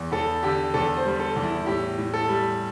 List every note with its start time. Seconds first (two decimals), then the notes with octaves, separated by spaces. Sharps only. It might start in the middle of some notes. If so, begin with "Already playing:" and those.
Already playing: E2
0.12 E2 A4
0.43 D3 G4
0.74 E2 A4
0.97 C5
1.05 G3
1.20 A4
1.36 E2
1.43 E4
1.66 A2 G4
1.98 A2
2.14 A4
2.29 G3